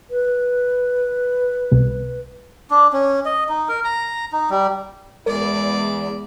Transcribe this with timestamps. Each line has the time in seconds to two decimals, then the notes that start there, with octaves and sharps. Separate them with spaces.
0.10 B4
1.72 C2
2.70 D4
2.93 C#4
3.25 D#5
3.49 D#4
3.69 A#4
3.84 A#5
4.32 D#4
4.50 G3
5.26 E2 G#3 E4 A#4 D5